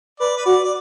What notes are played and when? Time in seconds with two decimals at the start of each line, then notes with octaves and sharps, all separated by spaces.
0.20 B4 D5
0.37 B4
0.45 F#4 D5
0.64 D5